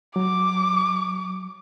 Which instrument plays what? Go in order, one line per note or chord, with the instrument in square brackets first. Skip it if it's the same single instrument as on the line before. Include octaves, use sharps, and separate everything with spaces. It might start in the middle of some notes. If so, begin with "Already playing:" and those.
[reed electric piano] F#3 [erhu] D6